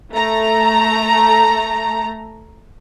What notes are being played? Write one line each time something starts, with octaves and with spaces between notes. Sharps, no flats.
A3 A#5